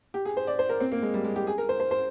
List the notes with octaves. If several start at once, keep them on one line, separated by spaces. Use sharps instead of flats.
G4
G#4
C5
D5
C5
A#4
C4
A#3
G#3
G3
G#3
G4
G#4
A#4
C5
C5
C5